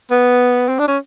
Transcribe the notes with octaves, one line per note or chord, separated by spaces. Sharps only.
B3
C4
D4
C#4